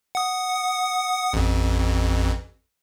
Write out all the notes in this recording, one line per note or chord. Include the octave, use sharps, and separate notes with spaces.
F#5 D#6
A1 F2